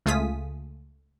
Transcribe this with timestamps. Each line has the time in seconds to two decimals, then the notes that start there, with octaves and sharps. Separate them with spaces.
0.06 C#2 A3 F4 G#4 D#6 B6